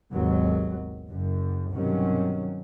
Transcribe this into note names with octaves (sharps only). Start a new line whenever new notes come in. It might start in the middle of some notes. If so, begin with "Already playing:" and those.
G#1 D#2 B2 F#3
F#1 F#2
B1 G2 C3 D#3 F#3 C#4